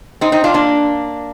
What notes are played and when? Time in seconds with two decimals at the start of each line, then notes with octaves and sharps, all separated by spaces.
0.21 C4 D#4
0.32 C4 D#4
0.44 D4 F4
0.54 A#3 D4